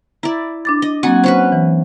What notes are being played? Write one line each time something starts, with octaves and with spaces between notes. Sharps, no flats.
E4 D5 A#5
D4 D6 A6
D#5
F#3 A#3 C4 F#4 F#5 G#5
C#4 F#4 B4 C5
E3